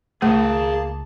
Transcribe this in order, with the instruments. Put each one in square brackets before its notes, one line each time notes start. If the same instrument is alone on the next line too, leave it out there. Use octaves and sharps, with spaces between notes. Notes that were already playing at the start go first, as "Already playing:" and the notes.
[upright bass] C#2 [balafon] A3 [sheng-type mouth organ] A#3 A5 [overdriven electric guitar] G#4 B5